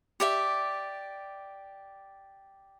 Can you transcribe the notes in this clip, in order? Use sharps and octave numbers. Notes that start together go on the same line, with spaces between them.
G4 D5 E5